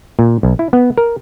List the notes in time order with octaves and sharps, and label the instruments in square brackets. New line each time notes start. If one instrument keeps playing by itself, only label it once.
[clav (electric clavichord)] A#2
B1
E4
B3
A#4